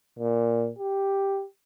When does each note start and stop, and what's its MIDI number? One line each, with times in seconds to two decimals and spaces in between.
0.19 0.70 46
0.78 1.43 67